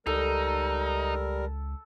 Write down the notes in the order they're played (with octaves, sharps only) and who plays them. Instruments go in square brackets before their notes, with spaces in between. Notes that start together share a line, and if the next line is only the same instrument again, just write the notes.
[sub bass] C#2 [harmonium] G3 A#4 [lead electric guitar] D#4 [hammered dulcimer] A4